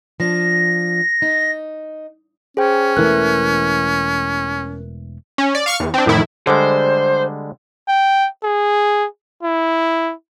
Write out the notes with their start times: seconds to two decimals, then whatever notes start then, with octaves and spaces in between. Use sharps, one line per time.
0.20 F3 D4 A#6
1.22 D#4
2.57 C#4 G#4 C5 G5
2.97 E1 E3 A3 A#4 F#6
5.38 C#4
5.55 D5
5.66 F5 C#6 F6
5.80 E2
5.94 C4 D4
6.06 F2 A2 D#3 E4
6.47 D3 G3 G#3 C5
7.88 G5
8.43 G#4
9.43 E4